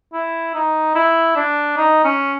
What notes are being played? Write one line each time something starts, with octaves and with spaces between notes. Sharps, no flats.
E4
D#4
E4
D4
D#4
C#4